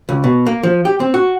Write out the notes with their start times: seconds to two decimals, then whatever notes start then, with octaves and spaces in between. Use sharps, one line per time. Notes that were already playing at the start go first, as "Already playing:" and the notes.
0.09 C#2
0.24 B2
0.46 A#3
0.63 F3
0.85 G4
1.00 C4
1.14 F#4